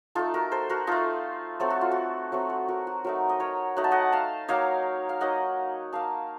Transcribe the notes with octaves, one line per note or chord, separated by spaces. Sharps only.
A3 D#4 F4 A4
F#4 A#4
A4 C5
F#4 A#4
A3 D#4 F4 A4
F#3 A3 C4 A4
F#4
F4
F#4
F#3 A3 C4 F#4
F#4
F#4 A#4
F#4
F#3 A3 D#4 F#4 A#4
D#5
A#4 C#5
F#3 A3 D#4 F#5
A5
D#5 F#5
F5 A5
F#3 A#3 D#4 C#5 F5
F5
F#3 A#3 D#4 D#5 F#5
A#3 D#4 F5 A5